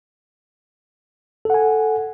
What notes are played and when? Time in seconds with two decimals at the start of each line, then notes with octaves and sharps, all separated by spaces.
1.45 A4
1.50 F#5
1.54 G#5